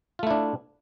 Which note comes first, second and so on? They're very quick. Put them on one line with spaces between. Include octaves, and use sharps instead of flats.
F4 A3 E4 D4